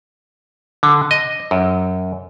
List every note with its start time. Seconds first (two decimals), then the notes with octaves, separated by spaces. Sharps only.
0.83 D3
1.11 D#5
1.51 F#2